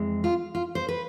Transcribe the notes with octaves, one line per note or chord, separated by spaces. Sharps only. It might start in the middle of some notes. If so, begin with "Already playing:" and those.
Already playing: F2 E3 G#3
F4
F4
C5
B4